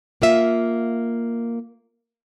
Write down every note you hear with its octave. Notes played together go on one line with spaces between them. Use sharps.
A#3 F4 E5